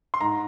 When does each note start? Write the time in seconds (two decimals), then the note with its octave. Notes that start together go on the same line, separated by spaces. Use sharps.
0.14 C6
0.21 G#2 A#5